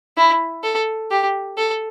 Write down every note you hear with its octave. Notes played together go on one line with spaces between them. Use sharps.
E4
A4
G4
A4